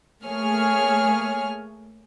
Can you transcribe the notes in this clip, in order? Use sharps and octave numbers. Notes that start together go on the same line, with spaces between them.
A3 A#3 G#4 C#5 G#5 F6